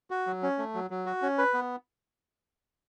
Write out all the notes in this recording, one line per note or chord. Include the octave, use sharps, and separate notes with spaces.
F#4
F#3
C#4
A3
F#3
F#3
F#4
C#4
B4
B3